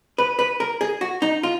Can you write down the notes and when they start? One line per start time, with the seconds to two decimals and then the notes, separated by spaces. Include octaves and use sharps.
0.18 B4
0.39 B4
0.60 A#4
0.81 G#4
1.01 F#4
1.22 D#4
1.43 F4